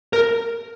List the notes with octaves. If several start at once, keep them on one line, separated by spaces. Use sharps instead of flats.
A#4